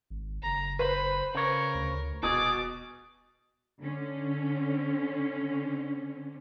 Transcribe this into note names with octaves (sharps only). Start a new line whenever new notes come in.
G#1
F#1 A#5
B4 C5 B5
C#3 A#4 C#5
D2
D#1 B2 G#4 D6
D3 C#4